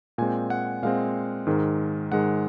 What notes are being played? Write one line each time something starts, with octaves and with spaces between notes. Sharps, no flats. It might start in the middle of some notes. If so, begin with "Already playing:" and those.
A#2 G#3 C4 G#5
F#5
A#2 G#3 C4 F5
G#2 D#3 G#3
G#2 D#3 G#3 F#5